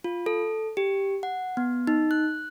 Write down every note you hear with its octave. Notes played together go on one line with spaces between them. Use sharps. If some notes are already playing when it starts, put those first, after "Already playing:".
F4
A4
G4
F#5
B3
D#4
F#6